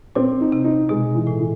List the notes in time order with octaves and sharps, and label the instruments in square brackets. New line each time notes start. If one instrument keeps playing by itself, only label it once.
[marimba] A#2 [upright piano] C4
[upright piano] D#4
[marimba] C3
[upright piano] D#4
[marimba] B2 [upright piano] G#3
[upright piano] E3
[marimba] A2
[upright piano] E3